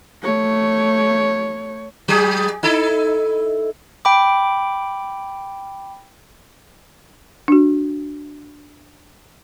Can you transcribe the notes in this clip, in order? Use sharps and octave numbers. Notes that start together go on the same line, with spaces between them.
A3 C#5
F#3 G#4
D#4 E4 A4
G5 B5 D6
D4 F#4